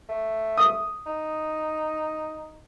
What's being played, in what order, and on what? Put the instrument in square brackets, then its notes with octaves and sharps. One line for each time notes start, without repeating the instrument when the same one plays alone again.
[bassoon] A3
[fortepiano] D#6
[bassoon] D#4